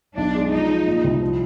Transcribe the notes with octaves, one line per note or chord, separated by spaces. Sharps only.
B1 D4
G#3
F3 D#4
F3
A#2
C2
F3